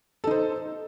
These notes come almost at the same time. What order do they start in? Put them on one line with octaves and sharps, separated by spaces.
A4 D#4 C5